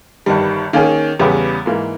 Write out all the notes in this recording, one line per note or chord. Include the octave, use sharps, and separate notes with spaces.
G1 G2 D#3 G3
D#3 A#3 C#4 G#4
E2 C#3 G3 B3 G4
G#2 E3 A#3